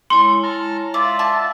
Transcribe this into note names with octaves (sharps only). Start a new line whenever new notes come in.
G#3 E4 C#5 C6
A5 A#5 F6
F4 D5 E5
F#5 A5